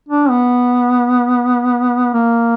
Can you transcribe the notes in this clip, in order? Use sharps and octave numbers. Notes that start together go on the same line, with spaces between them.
D4
B3
A#3